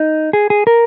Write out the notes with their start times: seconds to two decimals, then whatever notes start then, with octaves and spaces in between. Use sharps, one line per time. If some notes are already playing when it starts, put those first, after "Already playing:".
Already playing: D#4
0.33 G#4
0.50 G#4
0.67 A#4